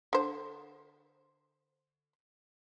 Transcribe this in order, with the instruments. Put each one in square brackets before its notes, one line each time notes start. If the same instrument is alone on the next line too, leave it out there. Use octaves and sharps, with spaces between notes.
[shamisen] D3 C5